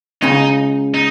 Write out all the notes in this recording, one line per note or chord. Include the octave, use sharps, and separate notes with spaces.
C#2 C#3 D#4
D#4